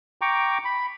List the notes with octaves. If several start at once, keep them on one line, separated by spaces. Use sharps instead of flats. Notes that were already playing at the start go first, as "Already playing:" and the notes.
G5 A#5 C#6 D6
B5